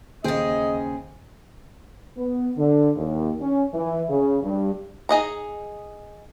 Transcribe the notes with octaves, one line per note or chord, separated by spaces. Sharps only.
D#2 C#3 G#4 C5 D#5 G5
B3
D3
D#2
C#4
E3
C#3
G2
D#4 G#4 D#5 A#5